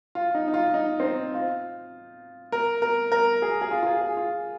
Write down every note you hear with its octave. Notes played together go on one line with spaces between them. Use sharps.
F4
D#4
D#4
F4
D#4
C4
D#4
F4
A#4
A#4
A#4
G#4
G#4
F4
F4
G#4
G#4
F4